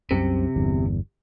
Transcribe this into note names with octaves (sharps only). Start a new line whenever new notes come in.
C2 F#2 C3 C4
G1 E2